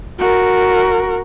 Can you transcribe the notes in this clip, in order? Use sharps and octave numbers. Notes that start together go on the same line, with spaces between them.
F#4 A#4